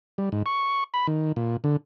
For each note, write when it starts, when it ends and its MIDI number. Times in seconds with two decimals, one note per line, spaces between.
0.18 0.29 55
0.32 0.43 44
0.46 0.84 85
0.94 1.07 83
1.07 1.32 51
1.36 1.57 46
1.64 1.77 50